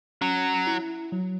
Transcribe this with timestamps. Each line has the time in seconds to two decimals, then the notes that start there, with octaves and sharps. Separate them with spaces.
0.21 F#3 C#4
0.67 E4
1.12 F#3